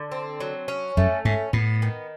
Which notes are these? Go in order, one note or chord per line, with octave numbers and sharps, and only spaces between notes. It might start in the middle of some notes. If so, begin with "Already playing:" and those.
Already playing: D3
C4
F#3
C#4
F#2 A3
G#2 C#4
A2 B3
D#3